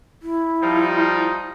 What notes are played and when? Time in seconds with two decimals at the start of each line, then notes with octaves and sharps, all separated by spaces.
0.22 E4
0.62 F3 G3 D#4